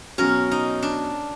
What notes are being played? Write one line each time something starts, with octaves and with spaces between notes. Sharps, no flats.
B2 F#3 C#4 A#4
D#4
D4